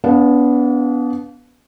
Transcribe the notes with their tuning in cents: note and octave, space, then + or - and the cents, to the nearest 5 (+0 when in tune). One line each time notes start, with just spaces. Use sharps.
B3 +0 D4 -35 F5 +20